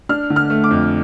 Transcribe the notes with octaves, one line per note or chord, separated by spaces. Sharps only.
D4 F6
D3
F6
A3
D6
F2